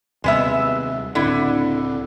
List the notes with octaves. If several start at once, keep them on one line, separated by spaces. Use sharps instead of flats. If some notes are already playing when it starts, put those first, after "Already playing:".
D#2 C3 G3 G#3 B3 E5
C#2 A2 D3 C4 E4